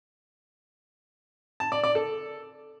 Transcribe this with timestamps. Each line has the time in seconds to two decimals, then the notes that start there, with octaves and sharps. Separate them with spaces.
1.60 A5
1.72 D5
1.83 D5
1.95 A4